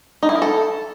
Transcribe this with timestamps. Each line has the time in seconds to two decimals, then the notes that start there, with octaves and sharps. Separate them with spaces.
0.23 D#4
0.29 E4
0.35 A#4
0.42 A4